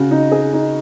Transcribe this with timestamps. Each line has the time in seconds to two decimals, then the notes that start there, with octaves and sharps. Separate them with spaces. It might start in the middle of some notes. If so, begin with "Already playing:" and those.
Already playing: C#3 F#4
0.11 D#4
0.31 G#4
0.53 D#4